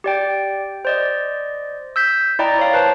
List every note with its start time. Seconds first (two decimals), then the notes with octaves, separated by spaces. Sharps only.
0.04 G4 D5 G5
0.85 C5 D5 D#5
1.96 E6 G6 B6
2.39 E4 D5 D#5 G5 A#5 A6
2.59 C#5 F5
2.74 B4 C5 A5